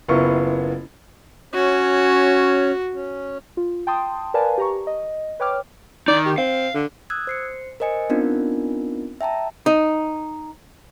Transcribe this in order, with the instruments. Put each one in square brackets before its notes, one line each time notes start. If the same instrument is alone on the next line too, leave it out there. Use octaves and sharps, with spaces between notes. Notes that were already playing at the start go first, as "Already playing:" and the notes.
[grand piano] F#1 B3 E4 F4 A#4 C#6
[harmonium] C#4 C#5 [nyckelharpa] F#4
[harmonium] C#4
[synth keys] F4
G5 A5 C6 D#6
A#4 B4 D5 F5 G#5 A5
G4 A#5 C#6
D#5
B4 C#5 G5 D6 F6
[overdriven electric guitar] D#3 D#4 [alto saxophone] D5
[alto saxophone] G4
[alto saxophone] C4 [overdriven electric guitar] F5
[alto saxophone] D3
[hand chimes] D#6 E6 F#6 G#6
C5 C7 C#7
A#4 C5 D#5 G#5 C#7
B3 C4 D4 D#4 F4 A#4
E5 G5 A5 A#5
[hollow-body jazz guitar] D#4